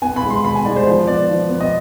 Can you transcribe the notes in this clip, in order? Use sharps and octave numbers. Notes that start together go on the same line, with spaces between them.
B3 G#5
B5
G#3
C6
B2 B5
G#5
G#3 D5
C5
F3 C5
B3 D5
F3
B3
D#5